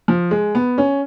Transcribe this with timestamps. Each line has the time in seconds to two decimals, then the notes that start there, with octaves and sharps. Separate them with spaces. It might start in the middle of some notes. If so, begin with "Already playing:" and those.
0.08 F3
0.31 G#3
0.55 B3
0.78 C#4